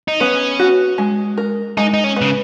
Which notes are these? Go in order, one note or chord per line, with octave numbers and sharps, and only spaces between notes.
D#4
B3 C#4
F#4
G#3
A#4
G#3 D#4
D#4
C#4
C#3 B3